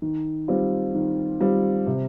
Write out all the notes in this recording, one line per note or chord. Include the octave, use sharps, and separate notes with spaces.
D#3
G3 C4 F4
D#3
G3 C4 F4
C3